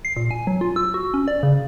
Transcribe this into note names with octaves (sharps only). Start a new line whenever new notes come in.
C7
A#2
G#5
F#3
F4
E6
F#4
C#4
D5
C#3